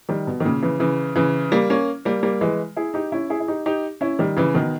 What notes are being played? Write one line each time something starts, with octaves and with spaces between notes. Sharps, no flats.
D#3 G3
B2
D#3
A#2 C#3
C#3 E3
C#3 E3
C#3 E3
G3 A#3
A#3 C#4
G3 A#3
G3 A#3
E3 G#3
E4 G#4
D#4 G4
C#4 E4
E4 G#4
E4
D#4 G4
D#4 G4
C#4 E4
D#3 G3
C#3 E3
B2 D#3